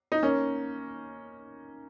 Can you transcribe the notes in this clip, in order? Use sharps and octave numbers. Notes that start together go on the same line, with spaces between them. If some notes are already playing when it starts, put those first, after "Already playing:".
D#4
A#3 C#4